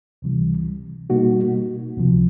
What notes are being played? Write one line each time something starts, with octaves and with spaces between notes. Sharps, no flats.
C#2 C3 E3 G3
B2 G3 A#3 D#4 F#4
C#2 C3 F3